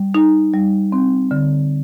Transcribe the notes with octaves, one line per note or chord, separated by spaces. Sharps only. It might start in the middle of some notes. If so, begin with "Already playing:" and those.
Already playing: G3
D#4
G3
C4
D3